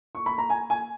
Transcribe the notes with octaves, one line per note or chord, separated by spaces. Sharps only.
C#6
B5
A#5
G#5
G#5